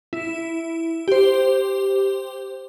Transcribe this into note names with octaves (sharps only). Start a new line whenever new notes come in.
E4
G4 C5